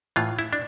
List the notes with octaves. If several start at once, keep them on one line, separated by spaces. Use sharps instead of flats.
A2 E3 F4
E4
D4